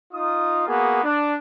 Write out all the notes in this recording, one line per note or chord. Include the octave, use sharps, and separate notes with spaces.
D#4 F4 D#6
A#3 B3 F#4 G#4
D4